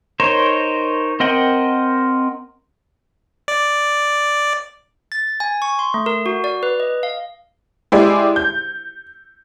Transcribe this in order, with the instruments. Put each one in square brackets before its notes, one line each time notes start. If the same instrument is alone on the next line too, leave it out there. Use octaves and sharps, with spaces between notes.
[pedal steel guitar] D#4 A#4 C5 C#5
C4 A#4 D#5 F#5 G5
[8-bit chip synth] D5
[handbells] A6
G#5
C#6
C6
A3
A#4
F#4
D5
B4
D#5
F5
[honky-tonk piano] G#3 E4 G4 G#4 D5
G6